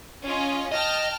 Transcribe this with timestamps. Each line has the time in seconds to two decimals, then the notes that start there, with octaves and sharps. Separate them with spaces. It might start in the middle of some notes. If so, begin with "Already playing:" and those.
0.23 C#4 F4 D#5
0.72 D#5 G5 A5 F6